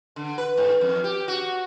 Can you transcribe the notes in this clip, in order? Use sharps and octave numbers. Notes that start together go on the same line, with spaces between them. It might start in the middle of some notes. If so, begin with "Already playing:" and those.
D3
B4
G#2
F2
G4
F#4